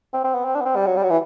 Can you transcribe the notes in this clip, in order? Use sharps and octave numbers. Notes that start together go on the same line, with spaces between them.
C4
C4
B3
C4
D4
B3
C4
G3
F#3
G3
F#3
E3